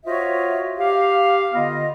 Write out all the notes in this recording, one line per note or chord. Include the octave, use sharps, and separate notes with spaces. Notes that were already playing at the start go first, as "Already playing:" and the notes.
F4 F#4 C5 C#5 D#5 E5
G4 F5
D3 B3 F4 D#5